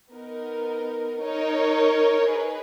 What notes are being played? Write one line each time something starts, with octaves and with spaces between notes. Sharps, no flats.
B3 D#4 A#4
D#4 A#4 C#5
G#4 B4